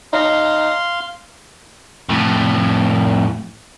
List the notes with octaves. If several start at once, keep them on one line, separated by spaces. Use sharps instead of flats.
D#4 F5 C6
F2 A2